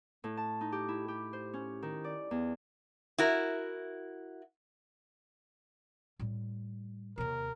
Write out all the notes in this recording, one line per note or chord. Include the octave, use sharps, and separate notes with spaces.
A2
A5
D#4
G4
E4
G4
C5
C#4
D#3
D5
E2
E4 F#4 A#4
A2 G3
D#2 C3 A#4